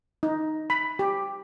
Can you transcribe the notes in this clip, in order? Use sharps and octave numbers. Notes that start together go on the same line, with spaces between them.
D#4
B5
G4